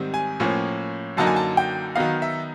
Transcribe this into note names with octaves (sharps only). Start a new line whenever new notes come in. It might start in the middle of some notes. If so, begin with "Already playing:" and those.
Already playing: G#2 D#3 G3 C4
G#5
A2 F3 A#3 C#4
F#2 D3 F#3 A#3 D#4 A5
G#5
A5
G5
D#3 F#3 B3 D#4 F5
E5